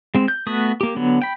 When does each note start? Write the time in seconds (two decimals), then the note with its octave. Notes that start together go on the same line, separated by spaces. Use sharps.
0.15 G#3 C4
0.28 G6
0.47 A3 B3 F#4 D#6
0.81 A#3 G4
0.96 D3 F#3 B3
1.22 G5 B5